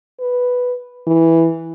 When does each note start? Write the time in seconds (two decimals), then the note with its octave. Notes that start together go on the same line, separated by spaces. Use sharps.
0.20 B4
1.07 E3